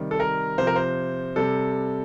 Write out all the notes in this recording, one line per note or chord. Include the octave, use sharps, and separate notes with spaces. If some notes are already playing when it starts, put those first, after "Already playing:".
Already playing: C3 D#3 G3
A4
A#4
C3 F3 C5
A#4
C5
C3 G3 A4